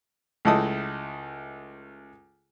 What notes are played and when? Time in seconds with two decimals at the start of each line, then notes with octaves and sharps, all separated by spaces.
0.45 C#2 A3 E4 A4 D#5 D#6